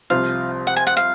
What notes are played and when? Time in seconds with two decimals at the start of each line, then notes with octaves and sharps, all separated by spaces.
0.10 C2 C3 F3 C4 F4 F5
0.67 F#5
0.76 G#5
0.87 F#5
0.97 F5